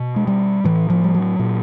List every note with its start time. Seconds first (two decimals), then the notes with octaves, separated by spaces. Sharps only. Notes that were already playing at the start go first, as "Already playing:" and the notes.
Already playing: B2
0.16 G#3
0.27 G3
0.64 A2 E3
0.90 F3
1.04 G3
1.15 F#3
1.39 A#2